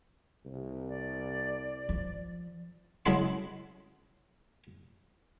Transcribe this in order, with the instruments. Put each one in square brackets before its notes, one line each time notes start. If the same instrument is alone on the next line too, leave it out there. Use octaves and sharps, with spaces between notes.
[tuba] C2
[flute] D5
[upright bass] F3
[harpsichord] C#3 F#3 G#3 E4 E5 C6